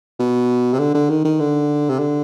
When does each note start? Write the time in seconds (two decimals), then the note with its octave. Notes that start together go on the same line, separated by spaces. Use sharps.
0.20 B2
0.73 C3
0.79 D3
0.95 D3
1.10 D#3
1.25 D#3
1.40 D3
1.90 C3
1.99 D3